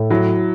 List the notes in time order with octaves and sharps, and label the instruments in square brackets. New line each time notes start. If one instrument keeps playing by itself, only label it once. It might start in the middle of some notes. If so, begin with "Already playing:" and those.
Already playing: [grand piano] A2
[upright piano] F#3 [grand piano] E4